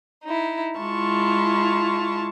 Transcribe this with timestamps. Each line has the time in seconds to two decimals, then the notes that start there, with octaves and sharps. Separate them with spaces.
0.24 D#4 E4
0.78 G#3 E4 F4 A5 C#6